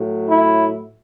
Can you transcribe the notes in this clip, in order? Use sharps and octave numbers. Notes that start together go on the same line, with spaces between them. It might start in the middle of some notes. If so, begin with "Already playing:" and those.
Already playing: A2 F#3
E4